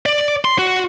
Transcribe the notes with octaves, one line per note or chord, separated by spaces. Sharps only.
D5
C6
F#4